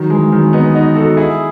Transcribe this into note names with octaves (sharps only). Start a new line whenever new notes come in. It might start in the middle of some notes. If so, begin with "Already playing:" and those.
Already playing: D#3 F#3
E3 G#3
D#3 F#3
B3 D#4
D#4 F#4
F#4 A4
E4 G#4